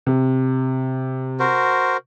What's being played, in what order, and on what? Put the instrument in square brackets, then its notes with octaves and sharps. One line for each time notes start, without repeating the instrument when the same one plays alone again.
[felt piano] C3
[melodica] F#4 A#4 C5